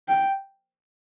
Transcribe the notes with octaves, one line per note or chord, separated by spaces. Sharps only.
G5